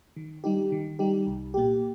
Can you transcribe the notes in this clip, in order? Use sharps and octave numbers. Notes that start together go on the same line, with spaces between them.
D#3
G3 D#4 G4
D#3
G3 D#4 G4
C2
A#2 A#3 G4